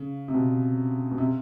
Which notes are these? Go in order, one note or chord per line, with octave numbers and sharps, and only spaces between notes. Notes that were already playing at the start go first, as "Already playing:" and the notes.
Already playing: C#3
C3
B2
B2
C3